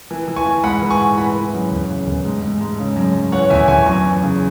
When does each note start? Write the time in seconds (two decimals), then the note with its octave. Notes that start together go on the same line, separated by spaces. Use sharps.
0.11 E3
0.28 E3
0.36 G#5 C#6
0.46 E3
0.64 G#2 F#5 B5
0.82 E3
0.90 G#5 C#6
1.00 G#2
1.17 E3 F#5 B5
1.35 E3
1.53 F#2
1.71 E2
1.89 C#3
2.07 E2
2.25 G#2
2.43 G#2
2.61 G#2
2.78 C#3
2.96 F#2
3.14 F#2
3.32 E3 C#5 F#5
3.50 E2 E5 G#5
3.68 E2 G#5 C#6
3.86 F#2 G#5 C#6
4.04 E3
4.22 C#3